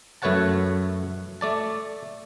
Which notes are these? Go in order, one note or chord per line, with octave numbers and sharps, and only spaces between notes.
F#2 A3 B4 C#5 F#5 A5
A3 D5 A5